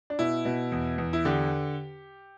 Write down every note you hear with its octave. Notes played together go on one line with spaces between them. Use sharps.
D4
B2 E4
B2
E2
E2
E4
D3 G4